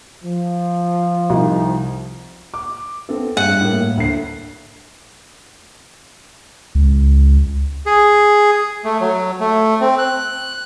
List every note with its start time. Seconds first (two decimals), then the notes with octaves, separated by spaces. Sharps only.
0.23 F3
1.30 C2 D#4
2.54 D6
3.09 B3 C4 A4
3.37 G2 F#5
3.61 A2 A#3
3.97 D2 C7
6.75 C#2
7.86 G#4
8.84 A3
9.01 F#3
9.41 A3
9.81 C4
9.98 F#6